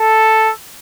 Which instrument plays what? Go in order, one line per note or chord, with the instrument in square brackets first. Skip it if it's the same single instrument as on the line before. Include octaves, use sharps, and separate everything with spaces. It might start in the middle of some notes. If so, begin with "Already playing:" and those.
Already playing: [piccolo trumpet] A4